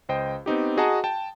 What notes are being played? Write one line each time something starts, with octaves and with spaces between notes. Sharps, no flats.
C#2 C5 D#5 G5
B3 C4 D#4 G4
F#4 G#4 D#5 F#5 A5 A#5
G5 A5